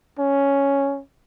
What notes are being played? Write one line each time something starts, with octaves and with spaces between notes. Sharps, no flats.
C#4